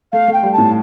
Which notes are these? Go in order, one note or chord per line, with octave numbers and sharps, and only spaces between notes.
A3 F5
A3
G5
G3
A5
A2